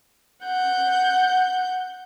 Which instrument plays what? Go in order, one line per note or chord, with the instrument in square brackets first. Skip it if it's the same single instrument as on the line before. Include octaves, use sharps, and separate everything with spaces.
[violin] F#5 G6